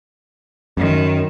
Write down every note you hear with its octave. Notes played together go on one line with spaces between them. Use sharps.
F#2 D#3